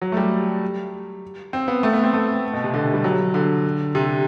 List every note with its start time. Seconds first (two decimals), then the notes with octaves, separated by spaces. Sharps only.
0.02 F#3
0.12 A3
0.17 G3
1.53 C4
1.68 B3
1.83 A3
1.93 B3
2.04 C4
2.13 A3
2.53 B2
2.64 C3
2.74 D3
2.94 G3
3.04 F#3
3.34 D3
3.95 C3